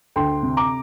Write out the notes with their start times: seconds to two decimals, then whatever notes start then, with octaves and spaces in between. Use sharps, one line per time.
0.16 D2 G5 C6
0.43 C3
0.57 A#5 D6